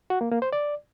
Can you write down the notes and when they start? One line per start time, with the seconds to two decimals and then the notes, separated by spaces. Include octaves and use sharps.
0.10 F#4
0.21 A#3
0.31 A#3
0.42 C5
0.53 D5